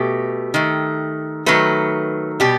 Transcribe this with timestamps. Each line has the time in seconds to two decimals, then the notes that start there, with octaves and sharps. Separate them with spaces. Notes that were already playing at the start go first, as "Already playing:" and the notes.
Already playing: B2 A3 G4
0.54 D#3 A3
1.46 D#3 F#3 A3 B4
2.40 B2 G3 G4